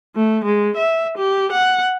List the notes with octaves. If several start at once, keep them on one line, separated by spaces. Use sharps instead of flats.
A3
G#3
E5
G4
F#5